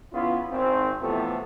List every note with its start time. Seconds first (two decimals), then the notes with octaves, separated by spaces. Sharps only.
0.13 C#3 B3 E4 F4
0.51 G#1 C4
1.00 A2 C3 E3 F3 A3 B3